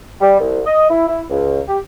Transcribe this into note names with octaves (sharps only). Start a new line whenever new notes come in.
G3
C2
D#5
E4
E4
C#2
G4